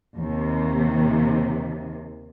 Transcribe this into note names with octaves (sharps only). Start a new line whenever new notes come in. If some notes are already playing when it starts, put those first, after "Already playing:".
D#2 C3